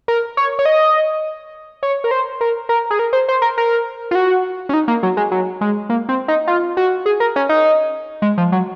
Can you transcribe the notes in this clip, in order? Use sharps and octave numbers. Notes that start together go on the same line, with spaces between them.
A#4
C#5
C#5
D#5
C#5
A#4
C5
A#4
A#4
G#4
A#4
C5
C5
A#4
A#4
F4
F#4
C#4
D#4
A#3
F#3
G#3
F#3
G#3
A#3
C4
D#4
F4
F#4
G#4
A#4
C#4
D#4
G#3
F3
F#3